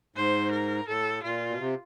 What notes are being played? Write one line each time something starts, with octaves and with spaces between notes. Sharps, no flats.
G#2 C5
A#4
A2 A4
A#2 F4
B2
C3